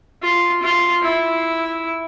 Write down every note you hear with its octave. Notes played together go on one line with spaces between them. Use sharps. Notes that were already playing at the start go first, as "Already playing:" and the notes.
F4
F4
E4